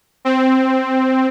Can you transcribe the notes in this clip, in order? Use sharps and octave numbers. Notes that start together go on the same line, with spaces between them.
C4